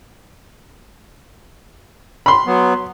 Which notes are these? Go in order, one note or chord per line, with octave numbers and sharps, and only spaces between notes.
B5 C6
F#3 B3